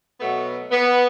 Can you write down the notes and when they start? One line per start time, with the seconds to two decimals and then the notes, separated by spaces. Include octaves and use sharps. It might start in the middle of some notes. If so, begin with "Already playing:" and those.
0.19 B2 F#3 A3 B3
0.71 B3